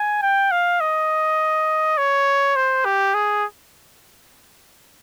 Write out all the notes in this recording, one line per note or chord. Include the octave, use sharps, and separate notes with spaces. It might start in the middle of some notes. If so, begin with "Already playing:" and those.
Already playing: G#5
G5
F5
D#5
C#5
C5
G4
G#4